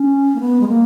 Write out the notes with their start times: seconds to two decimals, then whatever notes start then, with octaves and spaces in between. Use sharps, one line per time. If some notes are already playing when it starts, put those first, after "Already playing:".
Already playing: C#4
0.36 A#3
0.40 B3
0.61 G#3
0.68 A#3